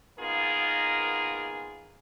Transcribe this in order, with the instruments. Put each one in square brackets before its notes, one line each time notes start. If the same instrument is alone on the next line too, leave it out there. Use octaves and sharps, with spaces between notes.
[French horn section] A#3 B3 D#4 F4 G#4 A#4